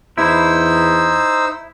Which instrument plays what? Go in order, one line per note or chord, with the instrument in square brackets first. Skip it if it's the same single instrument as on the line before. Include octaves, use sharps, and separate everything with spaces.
[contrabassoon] E2 [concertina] D#4 C5 E6 [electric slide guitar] E4